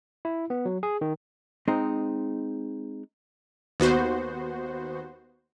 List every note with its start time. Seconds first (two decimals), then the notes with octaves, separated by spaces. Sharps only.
0.25 E4
0.50 B3
0.65 F#3
0.83 G#4
1.01 D#3
1.68 G#3 C4 D#4
3.80 D#2 B3 F#4 C5